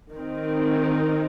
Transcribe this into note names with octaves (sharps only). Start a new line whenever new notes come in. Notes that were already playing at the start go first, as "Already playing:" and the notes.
D#3 C4 D#4